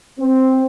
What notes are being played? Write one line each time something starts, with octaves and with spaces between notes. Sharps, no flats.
C4